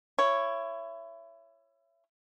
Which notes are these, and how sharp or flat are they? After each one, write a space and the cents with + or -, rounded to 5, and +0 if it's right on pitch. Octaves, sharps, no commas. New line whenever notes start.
E4 +25 C#5 +0